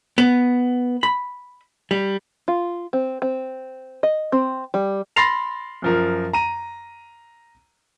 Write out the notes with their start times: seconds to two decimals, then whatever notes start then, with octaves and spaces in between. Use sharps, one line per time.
0.18 B3
1.03 B5
1.91 G3
2.48 F4
2.93 C4
3.22 C4
4.03 D#5
4.32 C4
4.74 G3
5.16 B5 C6 A6 A#6 C7 F7
5.82 F#2 F3 A#4
6.33 A#5 D#7